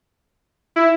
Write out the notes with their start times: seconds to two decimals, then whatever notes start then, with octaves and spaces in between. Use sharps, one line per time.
0.76 E4